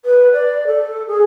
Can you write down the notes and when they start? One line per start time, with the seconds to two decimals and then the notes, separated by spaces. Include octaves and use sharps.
0.05 B4
0.33 D5
0.67 A4
1.07 G#4